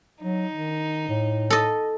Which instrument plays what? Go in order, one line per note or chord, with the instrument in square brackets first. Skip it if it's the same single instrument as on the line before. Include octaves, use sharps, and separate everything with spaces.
[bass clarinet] F#3 [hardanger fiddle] D#4
[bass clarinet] D#3
A2
[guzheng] A4 D#5